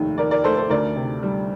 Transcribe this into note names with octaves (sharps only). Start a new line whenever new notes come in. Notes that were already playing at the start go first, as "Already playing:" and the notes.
Already playing: F1 D#2 D#3 A3
D#3 A#4 D5
A#4 D5
A3 A4 C5
A4 C5
D2 A#4 D5
C3
G3